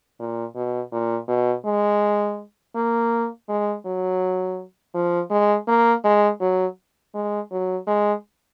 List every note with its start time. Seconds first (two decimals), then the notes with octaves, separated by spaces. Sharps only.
0.19 A#2
0.56 B2
0.92 A#2
1.28 B2
1.65 G#3
2.76 A#3
3.49 G#3
3.86 F#3
4.95 F3
5.31 G#3
5.68 A#3
6.04 G#3
6.41 F#3
7.14 G#3
7.51 F#3
7.87 G#3